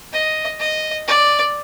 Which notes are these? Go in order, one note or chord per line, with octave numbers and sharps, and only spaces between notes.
D#5
D#5
D5